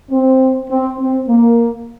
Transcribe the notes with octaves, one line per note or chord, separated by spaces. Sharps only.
C4
C4
C4
A#3